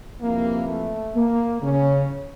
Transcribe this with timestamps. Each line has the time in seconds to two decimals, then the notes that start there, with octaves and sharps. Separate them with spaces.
0.21 F2 C3 E3 G3 A#3
0.68 A3
1.15 A#3
1.62 C#3 C#4